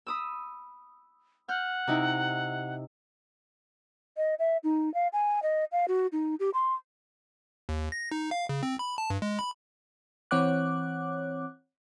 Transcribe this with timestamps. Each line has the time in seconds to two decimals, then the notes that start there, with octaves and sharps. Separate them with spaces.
0.06 B5 D#6 E6
1.48 F#5 F6 G6
1.87 C3 D#4 E4
4.17 D#5
4.39 E5
4.64 D#4
4.94 F5
5.13 G#5
5.43 D#5
5.72 F5
5.88 F#4
6.12 D#4
6.40 G4
6.54 C6
7.69 D#2
7.92 A#6
8.11 D#4
8.31 F5
8.49 C#3
8.63 C4
8.79 B5
8.98 A5
9.10 G2
9.22 G#3
9.39 B5
10.31 E3 C4 C#5 F#5 D6 F#6